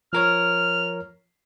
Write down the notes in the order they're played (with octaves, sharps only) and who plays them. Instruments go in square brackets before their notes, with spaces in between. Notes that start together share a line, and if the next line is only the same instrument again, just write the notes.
[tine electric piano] F3 A#4 C#5 [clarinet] F6